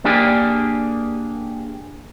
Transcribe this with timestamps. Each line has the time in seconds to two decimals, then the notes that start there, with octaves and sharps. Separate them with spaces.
0.04 A#3 D4 G4 G#4